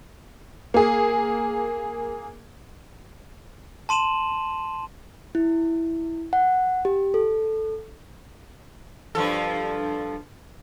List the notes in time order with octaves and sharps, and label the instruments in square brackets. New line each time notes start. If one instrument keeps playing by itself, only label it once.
[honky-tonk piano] A#3 G#4
[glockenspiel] A5 C6 D#7 E7 F#7
[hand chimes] E4
F#5
G4
A4
[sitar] G2 F3 A4